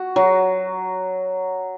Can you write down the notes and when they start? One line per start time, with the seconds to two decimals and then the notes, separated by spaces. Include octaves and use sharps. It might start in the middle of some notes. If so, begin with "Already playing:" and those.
Already playing: F#4
0.16 F#3